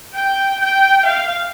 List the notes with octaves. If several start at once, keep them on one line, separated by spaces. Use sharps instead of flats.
G5
G5
F5